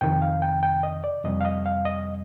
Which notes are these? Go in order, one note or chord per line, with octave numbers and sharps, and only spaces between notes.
F2 C3 D#3 G5
F5
G5
G5
D#5
D5
F2 C3 G3 D#5
F5
D#5
F5
D#5